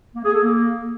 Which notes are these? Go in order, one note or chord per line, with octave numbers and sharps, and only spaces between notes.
A#3
G#4
A4
A#3